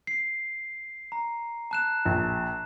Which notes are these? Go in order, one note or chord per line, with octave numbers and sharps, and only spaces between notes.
C7
A#5
A5 F#6 E7
A#1